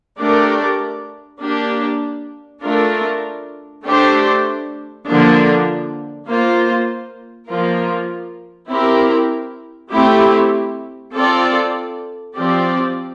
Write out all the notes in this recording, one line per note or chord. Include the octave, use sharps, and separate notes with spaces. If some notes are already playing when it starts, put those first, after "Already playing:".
A3 D4 G4 A#4 D5
A#3 D4 G4
A3 D4 F4 A#4
A3 D4 G4 C5
D3 F3 A#3 D4
A#3 F4 C5
F3 A#3 F4 A#4
C4 E4 G4 A#4
A3 C4 E4 G4
C4 F4 A4 D5
F3 C4 G4 D5